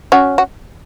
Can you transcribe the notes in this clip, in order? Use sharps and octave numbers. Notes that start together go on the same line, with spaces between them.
C#4 F#4
F#4